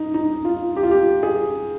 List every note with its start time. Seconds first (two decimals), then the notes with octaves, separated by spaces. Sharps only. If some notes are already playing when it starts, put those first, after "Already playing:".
Already playing: D#4
0.14 D#4
0.45 F4
0.76 G4
0.83 F4
0.91 G4
1.23 G#4